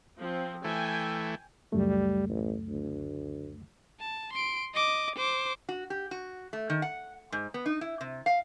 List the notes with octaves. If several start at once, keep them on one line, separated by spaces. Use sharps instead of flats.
F3 C4
E3 A3 G5 G#5
C#2 F#2 G3 A3
A1
D2
A5
C6 D7
D#5 D6
C5 D6
F#4
G4
F#4
A3
D#3
F#5
G#2
B3
D#4
E4
C3
F5